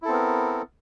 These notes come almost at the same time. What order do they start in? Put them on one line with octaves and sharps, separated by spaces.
E4 A4 C4 B3 A#4